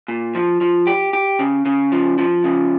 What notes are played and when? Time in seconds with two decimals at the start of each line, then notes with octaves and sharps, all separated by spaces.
0.08 A#2
0.35 F3
0.61 F3
0.87 G4
1.13 G4
1.39 C#3
1.65 C#3
1.92 F3
2.18 F3
2.44 C#3